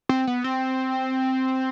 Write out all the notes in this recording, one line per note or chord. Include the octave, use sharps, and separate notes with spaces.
C4
B3
C4